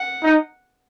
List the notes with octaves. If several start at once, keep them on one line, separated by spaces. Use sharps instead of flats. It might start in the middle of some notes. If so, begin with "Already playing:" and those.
Already playing: F#5
D#4